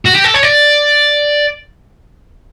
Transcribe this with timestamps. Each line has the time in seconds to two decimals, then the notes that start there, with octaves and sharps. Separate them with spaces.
0.05 F#4
0.15 G4
0.24 A4
0.34 C#5
0.43 D5